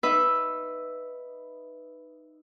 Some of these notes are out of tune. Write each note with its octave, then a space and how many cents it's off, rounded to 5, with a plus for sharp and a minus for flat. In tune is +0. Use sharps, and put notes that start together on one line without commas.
D#4 -10 B4 +0 E5 +0